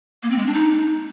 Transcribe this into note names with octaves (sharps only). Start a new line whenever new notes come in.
A#3
C4
G#3
D4
D#4